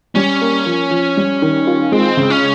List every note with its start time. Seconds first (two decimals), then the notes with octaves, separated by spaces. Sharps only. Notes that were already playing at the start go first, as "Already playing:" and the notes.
0.15 G3 C#4
0.41 A#3
0.66 F3
0.91 F3
1.17 G3
1.42 D#3
1.67 F4
1.92 G#3 C4
2.17 C#3
2.30 C#4